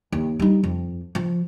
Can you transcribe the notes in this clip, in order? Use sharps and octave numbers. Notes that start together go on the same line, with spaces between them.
D#2
G3 D#4
F2
F3